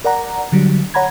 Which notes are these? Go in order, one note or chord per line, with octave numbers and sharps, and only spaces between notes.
A#4 D5 F#5 A#5
D3 F#3 G3
C#5 F#5 A#5 B5 G#6